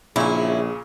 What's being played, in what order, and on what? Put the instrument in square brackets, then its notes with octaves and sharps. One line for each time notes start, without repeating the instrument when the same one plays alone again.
[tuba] A#1 [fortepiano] A#2 C#3 [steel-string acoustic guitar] C#4 E4 [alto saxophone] G#4